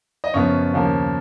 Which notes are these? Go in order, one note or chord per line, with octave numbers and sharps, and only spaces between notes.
D#5
F#2 C#3 F3 B3 C#5
D#2 C#3 F3 A#3